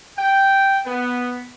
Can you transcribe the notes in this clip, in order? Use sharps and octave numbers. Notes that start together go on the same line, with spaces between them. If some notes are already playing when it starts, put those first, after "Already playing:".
G5
B3